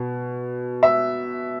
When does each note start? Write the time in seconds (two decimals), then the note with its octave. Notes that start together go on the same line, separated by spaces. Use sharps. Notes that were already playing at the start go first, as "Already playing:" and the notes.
Already playing: B2
0.83 E5